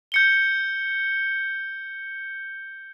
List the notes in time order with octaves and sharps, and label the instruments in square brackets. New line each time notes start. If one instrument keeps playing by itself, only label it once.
[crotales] G6 C#7 G7